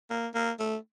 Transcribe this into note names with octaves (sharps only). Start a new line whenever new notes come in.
A#3
A#3
A3